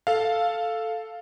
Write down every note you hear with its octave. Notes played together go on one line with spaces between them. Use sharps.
A4 F5